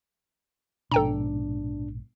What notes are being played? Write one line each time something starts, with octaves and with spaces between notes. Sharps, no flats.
A#1 G#2 B2 D4 A4 G5 A#5